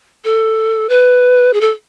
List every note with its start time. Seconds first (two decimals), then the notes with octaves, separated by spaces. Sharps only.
0.25 A4
0.89 B4
1.53 G#4
1.61 A4